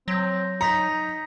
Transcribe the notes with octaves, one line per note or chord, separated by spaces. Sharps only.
F#3 C4 G6 A#6
D#4 A#5 A#6 B6 C#7